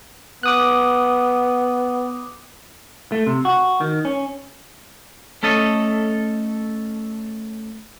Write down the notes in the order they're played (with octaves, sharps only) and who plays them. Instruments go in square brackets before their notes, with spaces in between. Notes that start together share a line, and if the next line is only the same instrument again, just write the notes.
[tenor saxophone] B3 [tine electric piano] D6 D#6 F#6
[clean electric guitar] A3
C3
F#4
D#3
C#4
A3 C#4 A4 D#5